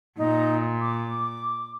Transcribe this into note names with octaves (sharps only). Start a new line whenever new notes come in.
A#2 D#4
D6